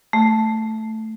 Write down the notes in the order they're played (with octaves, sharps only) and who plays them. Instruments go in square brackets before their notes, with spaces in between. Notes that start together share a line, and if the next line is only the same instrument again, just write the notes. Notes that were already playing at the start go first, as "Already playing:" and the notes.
[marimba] A3